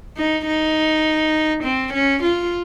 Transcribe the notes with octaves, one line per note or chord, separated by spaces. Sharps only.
D#4
D#4
C4
C#4
F4